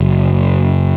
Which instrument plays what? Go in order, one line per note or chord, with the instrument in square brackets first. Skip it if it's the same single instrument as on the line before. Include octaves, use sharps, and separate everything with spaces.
[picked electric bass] F#1